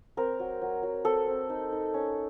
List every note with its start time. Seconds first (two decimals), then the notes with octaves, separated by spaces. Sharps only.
0.17 C4 A#4
0.39 F#3
0.62 F#3
0.83 F#3
1.05 C4 A4
1.27 C4
1.50 D#4
1.72 D#4
1.94 C#4